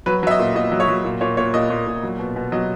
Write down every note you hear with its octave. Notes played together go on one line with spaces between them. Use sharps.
F#3 B4
F#3 E5
D#5
A#2
A#2 D#5
F#3
C#5
F#3
A#2
A#2 C#5
A#2 C#5
A#2 D#5
A#2
A#2
F#3
B2
B2
F#3 D#5